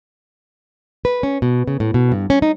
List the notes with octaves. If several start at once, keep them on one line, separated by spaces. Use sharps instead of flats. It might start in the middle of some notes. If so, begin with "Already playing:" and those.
B4
C#4
B2
C#3
A2
B2
G2
C#4
D#4